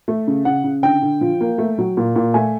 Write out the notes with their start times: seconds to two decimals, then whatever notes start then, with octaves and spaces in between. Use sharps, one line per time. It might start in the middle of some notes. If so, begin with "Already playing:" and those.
0.08 A3
0.27 C#3
0.45 C#3 F#5
0.64 C#3
0.83 D3 G5
1.02 D3
1.21 F3
1.41 A#3
1.58 A3
1.78 F#3
1.97 A#2
2.16 A#2
2.34 A3 G#5